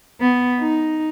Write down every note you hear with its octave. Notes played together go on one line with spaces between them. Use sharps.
B3
D#4